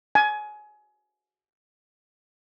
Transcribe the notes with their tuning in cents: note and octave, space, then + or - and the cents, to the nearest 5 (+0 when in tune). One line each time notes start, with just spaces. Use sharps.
G#5 +25